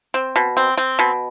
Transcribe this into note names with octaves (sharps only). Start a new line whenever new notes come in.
C4
B2
C4
C4
B2